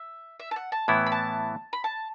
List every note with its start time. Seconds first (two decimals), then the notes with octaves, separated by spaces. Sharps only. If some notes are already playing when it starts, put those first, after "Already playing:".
Already playing: E5
0.40 E5
0.51 A5
0.56 F#5
0.72 A5
0.88 A2 E3 B3 E4 B5
1.06 B5
1.12 A5
1.73 B5
1.84 A5